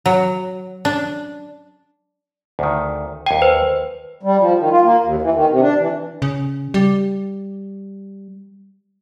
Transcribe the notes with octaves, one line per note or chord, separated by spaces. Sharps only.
F#3
D4
D2 D#3
D#2 G5 G#5
B4 C5
G3
F3
D#3
F4
A#3
D#2
E3
D#3
C3
D4
E3
C#3
G3